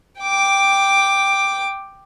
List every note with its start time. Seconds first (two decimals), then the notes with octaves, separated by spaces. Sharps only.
0.21 G5 D6